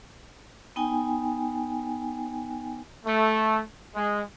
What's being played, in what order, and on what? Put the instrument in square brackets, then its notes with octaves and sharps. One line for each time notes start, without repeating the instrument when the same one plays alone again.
[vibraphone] B3 D#4 G5 G#5
[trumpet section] A3
G#3